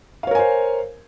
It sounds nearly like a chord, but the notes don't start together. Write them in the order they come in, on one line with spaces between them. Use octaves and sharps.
F5 C#5 A#4 G#5 C5